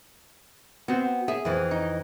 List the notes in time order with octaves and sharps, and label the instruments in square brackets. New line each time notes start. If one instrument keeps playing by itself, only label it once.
[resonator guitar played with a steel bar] B3 C4 [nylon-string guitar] F#4
[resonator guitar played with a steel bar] G#4 [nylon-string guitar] E5
[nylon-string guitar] F2 E3
[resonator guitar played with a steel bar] D#4